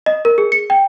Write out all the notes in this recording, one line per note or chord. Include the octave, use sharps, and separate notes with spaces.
D#5
A#4
G#4
C#7
G5